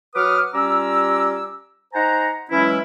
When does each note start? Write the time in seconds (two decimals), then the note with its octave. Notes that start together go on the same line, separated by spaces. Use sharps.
0.15 F#3 B4 F#5 D6 D#6 F6
0.54 G3 C#4 F4 A#5 D6 E6
1.94 D#4 C5 F#5 G#5 A#5
2.51 E3 F#3 G#3 C#4 E4